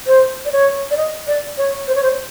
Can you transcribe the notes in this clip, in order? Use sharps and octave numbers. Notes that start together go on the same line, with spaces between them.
C5
D5
C#5
D5
D#5
D5
C#5
C5
C#5
C5